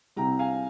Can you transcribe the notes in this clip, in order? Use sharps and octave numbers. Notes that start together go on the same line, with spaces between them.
C2 C3 G3 G5 A#5
F5 G#5